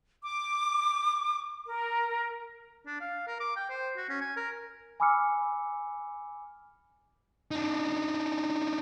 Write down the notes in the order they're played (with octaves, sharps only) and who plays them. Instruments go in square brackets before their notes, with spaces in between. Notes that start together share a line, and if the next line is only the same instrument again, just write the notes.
[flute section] D6
A#4
[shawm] D4
F5
A#4
D6
G5
C5
F#4
C#4
G#5
A#4
[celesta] G#5 B5 D6 E6 F6 C#7
[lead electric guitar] D4 D#4